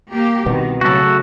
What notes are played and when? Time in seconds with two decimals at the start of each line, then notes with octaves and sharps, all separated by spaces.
0.10 A#3 G4
0.46 C2 B2 D#3 B3
0.81 C#3 F#3 A3 F#4 A4